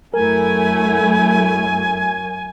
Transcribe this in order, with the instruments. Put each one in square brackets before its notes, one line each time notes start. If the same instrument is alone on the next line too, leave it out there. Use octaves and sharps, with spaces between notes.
[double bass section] F#2 [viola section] A3 E4 [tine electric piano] A#4 [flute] G#5